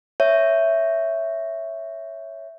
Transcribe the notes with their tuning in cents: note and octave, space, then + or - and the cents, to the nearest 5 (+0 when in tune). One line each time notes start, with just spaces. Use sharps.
C#5 +0 E5 +0